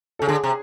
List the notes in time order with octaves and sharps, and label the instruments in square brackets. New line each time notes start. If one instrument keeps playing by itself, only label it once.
[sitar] C#3 [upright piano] A4
[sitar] D3 [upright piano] G#4
[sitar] C3